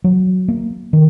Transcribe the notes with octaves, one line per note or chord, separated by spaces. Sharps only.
F#3
A#3
D#3